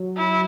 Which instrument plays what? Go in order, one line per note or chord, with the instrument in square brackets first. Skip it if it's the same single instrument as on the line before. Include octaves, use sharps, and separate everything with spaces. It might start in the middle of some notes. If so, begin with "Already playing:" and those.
Already playing: [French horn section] F#3
[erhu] E4